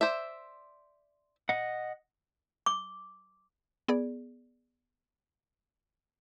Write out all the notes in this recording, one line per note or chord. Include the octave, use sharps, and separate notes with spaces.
C5 D5 E5
D#5 F#5
D6
B3 G#4 D5